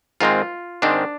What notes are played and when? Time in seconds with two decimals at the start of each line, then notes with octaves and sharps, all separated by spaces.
0.21 G#2 D#3 G#3 C4 F4
0.82 G#2 D#3 G#3 C4 D4